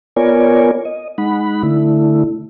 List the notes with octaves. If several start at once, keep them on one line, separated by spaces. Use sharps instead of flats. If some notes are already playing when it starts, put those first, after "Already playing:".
B3 F4 A#4 C#5 D5 G#5
D#5
G#3 D#4 F#5 B5
D3 A3 E4